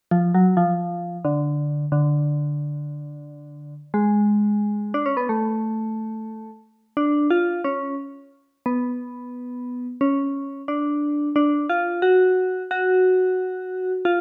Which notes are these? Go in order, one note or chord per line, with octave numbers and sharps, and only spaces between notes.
F3
F#3
F3
D3
D3
G#3
D4
C#4
B3
A3
D4
F4
C#4
B3
C#4
D4
D4
F4
F#4
F#4
F4